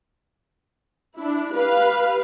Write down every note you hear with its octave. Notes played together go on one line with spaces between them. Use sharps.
D4 E4
G4 B4 F5